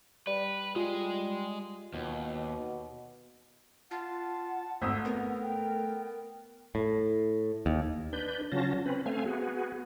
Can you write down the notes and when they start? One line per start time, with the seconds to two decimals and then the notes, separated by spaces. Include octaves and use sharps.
0.27 G3 B4 D5
0.76 G3 G#3 F4 G#4
1.94 D#2 B2
3.91 F4 F#5 A5
4.82 G#1 A3 D#6 E6
5.05 B3 A#4
5.42 G5
6.75 A2
7.66 D#2
8.13 D4 B4 G6
8.52 C#3 F#3 C#4 F4 A5 A#6
8.86 C4 C#4 B4
9.06 A3 C4 F5 G#5
9.25 B3 F#4 G#4